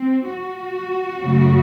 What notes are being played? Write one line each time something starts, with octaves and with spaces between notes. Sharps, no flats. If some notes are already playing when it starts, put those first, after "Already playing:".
Already playing: C4
F#4
F#2 C#3 F#3 A3